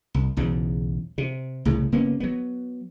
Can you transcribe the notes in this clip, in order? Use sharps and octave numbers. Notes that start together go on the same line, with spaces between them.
C2
B1 E2 G#2 C#3
C3
C2 A2 C#3
F#1 A#3 B3 C#4
F#3 B3